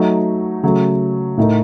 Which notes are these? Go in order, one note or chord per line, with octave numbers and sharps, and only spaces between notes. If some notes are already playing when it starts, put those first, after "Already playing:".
Already playing: F#3 A3 D#4
C#3 F#3 A3
A2 A3 D#4 A#4